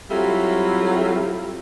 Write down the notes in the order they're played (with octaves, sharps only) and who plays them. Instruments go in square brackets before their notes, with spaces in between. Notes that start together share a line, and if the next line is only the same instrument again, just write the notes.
[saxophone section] F#3 G3 A3 C4 E4 F4